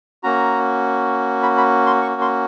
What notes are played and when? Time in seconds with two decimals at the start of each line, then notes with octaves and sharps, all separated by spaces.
0.23 A#3 C#4 F#4 A#5
1.43 B5
1.57 B5
1.87 C6
2.01 C#6
2.21 C6